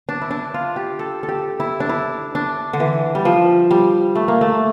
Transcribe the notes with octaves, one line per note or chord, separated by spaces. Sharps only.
D4
E4
D4
F4
G4
A4
A4
G4
E4
D4
E4
D4
D3
E3
G3
F3
G3
A3
A#3
A3